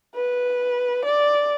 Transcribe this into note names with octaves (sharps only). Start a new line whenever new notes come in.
B4
D5